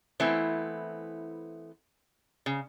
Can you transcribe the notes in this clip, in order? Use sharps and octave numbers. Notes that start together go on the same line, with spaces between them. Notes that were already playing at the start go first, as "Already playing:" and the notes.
E3 A3 B3 C4 E4
C#3